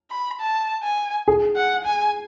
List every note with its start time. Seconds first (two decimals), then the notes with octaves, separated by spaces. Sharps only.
0.11 B5
0.40 A5
0.83 G#5
1.28 G#4
1.56 F#5
1.85 G#5